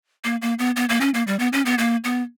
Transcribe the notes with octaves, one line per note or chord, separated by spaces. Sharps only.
A#3
A#3
B3
B3
A#3
C#4
A#3
G3
B3
C#4
B3
A#3
B3